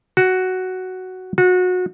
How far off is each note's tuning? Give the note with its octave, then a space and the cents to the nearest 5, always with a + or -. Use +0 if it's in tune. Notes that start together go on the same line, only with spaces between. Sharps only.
F#4 +5
F#4 -25